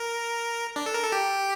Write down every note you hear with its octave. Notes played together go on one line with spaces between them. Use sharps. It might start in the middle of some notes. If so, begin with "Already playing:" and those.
Already playing: A#4
D4
A4
A#4
A4
G4